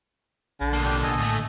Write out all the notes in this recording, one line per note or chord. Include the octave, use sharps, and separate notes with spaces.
A#1 D3
B2 A#3
D4 G4
A4 D#5 G#5
D2 A2 A3